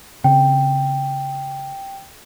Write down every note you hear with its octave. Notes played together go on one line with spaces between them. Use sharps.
C#3 C4 G5